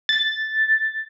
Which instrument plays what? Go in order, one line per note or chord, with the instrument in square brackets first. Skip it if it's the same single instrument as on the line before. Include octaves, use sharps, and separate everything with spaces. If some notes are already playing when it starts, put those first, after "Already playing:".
[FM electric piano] A6